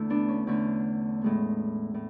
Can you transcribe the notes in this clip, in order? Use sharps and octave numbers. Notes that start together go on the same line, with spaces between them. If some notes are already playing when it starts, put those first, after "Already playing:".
Already playing: E2 D3 A3 E4
B3 D4
C#4
E2 D3 A3 C#4
A2 G#3 B3
A2